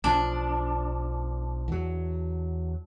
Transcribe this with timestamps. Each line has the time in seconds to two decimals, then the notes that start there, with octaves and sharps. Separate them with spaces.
0.04 B1 F3 D4
1.68 E2 F#3